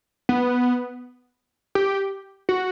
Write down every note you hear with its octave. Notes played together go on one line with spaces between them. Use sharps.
B3
G4
F#4